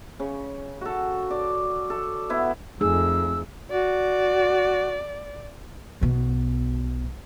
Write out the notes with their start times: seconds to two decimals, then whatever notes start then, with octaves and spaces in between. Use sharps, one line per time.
0.20 C#3
0.81 F#4 A4
1.31 D5
1.90 A4
2.30 B3 E4
2.81 F2 A3 D#4 G#4 E6
3.70 F#4 D5
6.01 B1 B2